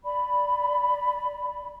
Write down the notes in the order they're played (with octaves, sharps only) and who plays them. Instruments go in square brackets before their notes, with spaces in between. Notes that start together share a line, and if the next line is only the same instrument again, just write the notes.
[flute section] D5 B5